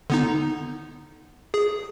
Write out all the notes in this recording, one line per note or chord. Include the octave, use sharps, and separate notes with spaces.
D3 B3 D#4
G#4